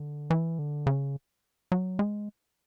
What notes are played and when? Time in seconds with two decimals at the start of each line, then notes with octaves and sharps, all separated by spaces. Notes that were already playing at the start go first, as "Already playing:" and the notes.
Already playing: D3
0.30 E3
0.59 D3
0.87 C#3
1.72 F#3
1.99 G#3